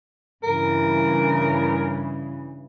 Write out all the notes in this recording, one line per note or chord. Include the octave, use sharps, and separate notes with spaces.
G2 C#3 E3 A#4